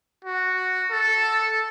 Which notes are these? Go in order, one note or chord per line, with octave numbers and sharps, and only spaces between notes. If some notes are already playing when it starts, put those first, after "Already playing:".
F#4
A4